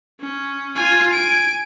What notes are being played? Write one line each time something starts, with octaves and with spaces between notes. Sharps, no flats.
C#4
F4 G#5
G#5 D7